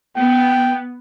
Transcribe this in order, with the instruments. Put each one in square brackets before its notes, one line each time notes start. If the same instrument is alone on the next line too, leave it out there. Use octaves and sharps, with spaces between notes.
[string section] B3 [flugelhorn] G5